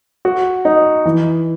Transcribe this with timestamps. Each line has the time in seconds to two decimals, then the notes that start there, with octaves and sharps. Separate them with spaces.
0.25 F#4
0.65 D#4
1.05 E3